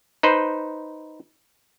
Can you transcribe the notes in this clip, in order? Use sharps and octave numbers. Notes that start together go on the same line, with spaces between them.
D#4 B4 C5